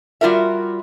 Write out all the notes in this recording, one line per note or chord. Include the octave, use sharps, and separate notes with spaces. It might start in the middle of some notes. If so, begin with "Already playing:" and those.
G3 F4 F#4 A#4 E5